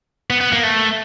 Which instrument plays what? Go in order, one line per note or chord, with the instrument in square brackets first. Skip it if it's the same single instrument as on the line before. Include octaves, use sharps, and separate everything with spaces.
[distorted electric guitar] B3
B3
A#3
A3